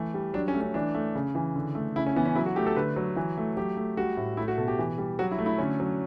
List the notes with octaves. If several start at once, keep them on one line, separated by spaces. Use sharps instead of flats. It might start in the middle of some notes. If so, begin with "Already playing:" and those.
Already playing: E3 A3
G3
F#3 D4
C#4
A3
C#4
E3 D4
A3
C#3
E3
D3
A3
C#3 E4
C#4
E3 B3
C#4
F#3 E4
F#4
A3 G4
A4
D3 B4
F#3
E3
A3
F#3 G4
A3
G3 F#4
A2
A3 E4
F#4
B2 A4
G4
E3
G3
F#3 F#4
E4
A3
E4
D3 C#4
F#3